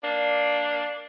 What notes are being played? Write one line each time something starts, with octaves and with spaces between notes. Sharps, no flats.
A#3 D4